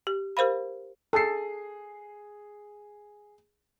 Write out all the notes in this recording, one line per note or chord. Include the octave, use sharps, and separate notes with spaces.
G4
G4 A#4 C5 F5 B5
G#4 A4 C7